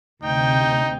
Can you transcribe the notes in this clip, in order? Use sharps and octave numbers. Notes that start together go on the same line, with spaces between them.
D2 C3 D#4 G5